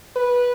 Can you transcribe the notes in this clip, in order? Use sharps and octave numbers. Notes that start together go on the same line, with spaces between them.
B4